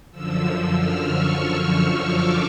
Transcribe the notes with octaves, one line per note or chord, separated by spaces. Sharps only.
F#2 D3 F3 E6
E6
F6
C#6
C#6
D6